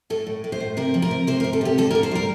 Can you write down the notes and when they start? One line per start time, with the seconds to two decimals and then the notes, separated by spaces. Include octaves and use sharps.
0.10 A2 A4
0.27 A2
0.44 A2
0.52 C5
0.60 A2
0.77 C3 A#4
0.94 F3
1.02 A#4
1.11 C3
1.27 C3 C5
1.40 A#4
1.44 C3
1.53 A4
1.61 C3 G4
1.78 D3 A4
1.91 A#4
1.95 D3
2.03 C5
2.11 G3 A#4